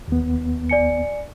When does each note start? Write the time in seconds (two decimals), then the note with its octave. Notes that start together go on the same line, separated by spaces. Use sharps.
0.08 D#2 B3
0.70 D5 G#5 C#7